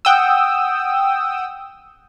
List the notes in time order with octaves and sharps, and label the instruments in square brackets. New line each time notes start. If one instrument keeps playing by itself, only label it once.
[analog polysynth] F#5 G5 D#6 E6